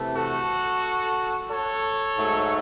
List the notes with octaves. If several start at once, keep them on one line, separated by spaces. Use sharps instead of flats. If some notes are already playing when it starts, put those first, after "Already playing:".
Already playing: C3 E3 A3
F#4 A4
A4 C#5
G#2 F#3 A3